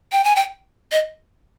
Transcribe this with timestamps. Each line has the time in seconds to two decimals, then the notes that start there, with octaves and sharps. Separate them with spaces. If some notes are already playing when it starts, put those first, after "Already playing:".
0.12 G5
0.24 G#5
0.36 G5
0.92 D#5